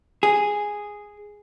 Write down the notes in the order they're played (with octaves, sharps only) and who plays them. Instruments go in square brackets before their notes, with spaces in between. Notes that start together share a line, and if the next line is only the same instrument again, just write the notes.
[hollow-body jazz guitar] G#4